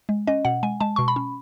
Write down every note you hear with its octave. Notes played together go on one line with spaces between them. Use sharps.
G#3
C#4 D#5
B2 F#5
G#3 G#5
G#3 A5
B2 C#6
B5
C#4